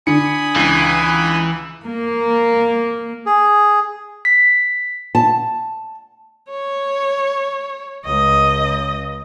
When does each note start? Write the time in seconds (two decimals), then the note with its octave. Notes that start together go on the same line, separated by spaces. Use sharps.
0.07 D3 G#5 B5 D#6 C#7
0.56 C#2 E3 C7
1.84 A#3
3.26 G#4
4.25 B6
5.15 A5
6.50 C#5
8.05 C#2 D#5